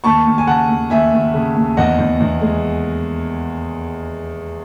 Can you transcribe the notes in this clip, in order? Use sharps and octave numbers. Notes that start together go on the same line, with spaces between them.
D#2 A5 C#6
D#2
G#5
C#3 F#5 A5
D#2
D#2 E5 G#5
D#2
C#3
D#2
E2 D#5 F#5
E2
E2
G#3